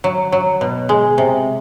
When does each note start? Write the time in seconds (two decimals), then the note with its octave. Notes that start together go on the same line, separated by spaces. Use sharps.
0.04 F#3
0.32 F#3
0.61 B2
0.89 G#3
1.18 C3